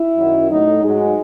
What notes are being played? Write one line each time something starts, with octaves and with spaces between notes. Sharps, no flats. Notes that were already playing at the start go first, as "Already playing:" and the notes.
Already playing: E4
F#2 D#3 F#3
A2 F#3 D#4
G#2 F#3 G#3